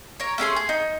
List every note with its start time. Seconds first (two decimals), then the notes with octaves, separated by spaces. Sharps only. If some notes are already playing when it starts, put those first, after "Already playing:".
0.20 A#4 C#5
0.38 A3 C#4 G#4 C6
0.56 G#4
0.69 D#4